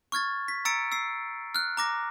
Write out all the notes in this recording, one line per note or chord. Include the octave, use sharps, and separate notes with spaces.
C#6 F6 G#6 A6
B6
A#5 E6 A6 C#7 D7
E6 C7
F6 F#6
A#5 D6 A#6